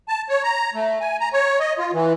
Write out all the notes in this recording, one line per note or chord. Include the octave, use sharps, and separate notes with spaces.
A5
C#5
A#5
A3
G#5
A#5
C#5
D#5
F4
E3